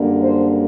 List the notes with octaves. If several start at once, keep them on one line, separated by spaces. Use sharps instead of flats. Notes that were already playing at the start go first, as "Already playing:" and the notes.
Already playing: F#2 D3 G3 A#3 D4
C5